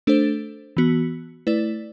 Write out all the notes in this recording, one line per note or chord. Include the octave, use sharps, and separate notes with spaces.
A3 D4 A4 C5
E3 B3 F#4
A3 E4 B4 D5